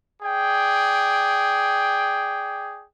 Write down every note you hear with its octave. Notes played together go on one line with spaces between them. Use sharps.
G#4 D5 G5